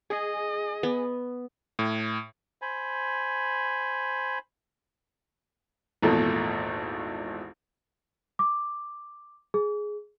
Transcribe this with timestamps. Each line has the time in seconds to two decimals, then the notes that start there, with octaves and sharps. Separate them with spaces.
0.10 G#4 D#5
0.83 B3
1.79 A2
2.62 C5 G#5 B5
6.02 G#1 E2 A#2 A3 A4
8.39 D6
9.54 G#4